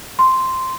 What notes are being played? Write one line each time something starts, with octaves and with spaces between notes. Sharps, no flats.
C6